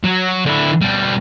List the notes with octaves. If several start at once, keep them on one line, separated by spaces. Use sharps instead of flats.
F#3
D3 E4
B2 G3